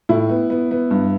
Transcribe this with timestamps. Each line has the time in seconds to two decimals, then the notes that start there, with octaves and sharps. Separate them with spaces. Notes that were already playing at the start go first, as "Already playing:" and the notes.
0.09 A2 E4
0.29 B3
0.50 B3
0.71 B3
0.91 G2